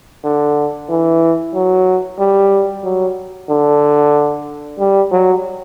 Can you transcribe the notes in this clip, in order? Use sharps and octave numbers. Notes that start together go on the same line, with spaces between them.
D3
E3
F#3
G3
F#3
D3
G3
F#3